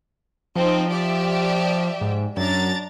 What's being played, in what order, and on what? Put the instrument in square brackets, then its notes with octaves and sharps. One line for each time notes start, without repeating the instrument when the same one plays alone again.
[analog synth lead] F3 [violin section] C4 D#4
[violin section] G4 D5 E5
[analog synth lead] G#2
[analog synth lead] F#2 [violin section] D4 A#5 A6